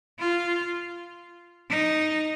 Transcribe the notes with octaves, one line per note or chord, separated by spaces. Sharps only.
F4
D#4